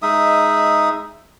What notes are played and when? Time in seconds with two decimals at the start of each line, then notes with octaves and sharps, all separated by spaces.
0.02 G#3 D#4 E5 D#6